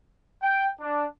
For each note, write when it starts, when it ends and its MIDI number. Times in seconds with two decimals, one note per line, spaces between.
0.42 0.69 79
0.80 1.05 62